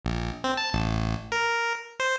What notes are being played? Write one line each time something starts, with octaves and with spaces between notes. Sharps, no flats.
A#1
C4
A5
A1
A#4
C5